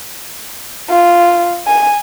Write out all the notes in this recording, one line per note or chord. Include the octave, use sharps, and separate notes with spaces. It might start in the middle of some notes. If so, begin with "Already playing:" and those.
F4
G#5